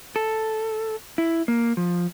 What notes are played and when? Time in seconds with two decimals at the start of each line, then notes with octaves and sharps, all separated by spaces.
0.16 A4
1.18 E4
1.48 A#3
1.77 F3